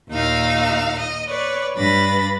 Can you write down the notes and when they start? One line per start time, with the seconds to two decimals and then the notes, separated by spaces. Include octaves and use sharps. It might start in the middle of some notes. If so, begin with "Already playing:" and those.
0.10 D#2 A#2 D#4 F5 E6
0.98 D#5
1.29 B4 C#5 D5
1.76 G2 D4 B4 B5 A6 A#6